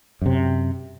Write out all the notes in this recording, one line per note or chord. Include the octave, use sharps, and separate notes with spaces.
F#2 C3